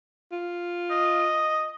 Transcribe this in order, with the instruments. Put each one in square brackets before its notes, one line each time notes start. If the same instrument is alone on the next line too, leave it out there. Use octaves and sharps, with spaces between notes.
[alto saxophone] F4
[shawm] D#5